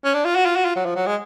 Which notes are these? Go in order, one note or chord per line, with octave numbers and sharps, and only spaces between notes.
C#4
D4
F4
F#4
F4
F#4
F4
F#3
F3
F#3
G#3